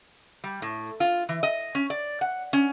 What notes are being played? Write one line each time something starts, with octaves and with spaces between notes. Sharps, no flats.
G3
A2
F4
E3
D#5
C#4
D5
F#5
C#4